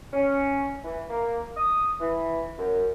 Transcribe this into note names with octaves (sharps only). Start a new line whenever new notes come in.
C#4
E3
A#3
D#6
E3
F#2